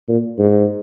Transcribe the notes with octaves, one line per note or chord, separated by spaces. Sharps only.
A#2
G#2